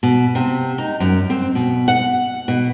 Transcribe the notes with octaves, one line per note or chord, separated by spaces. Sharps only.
B2
C3
D#4
F#2
C4
B2
F#5
B2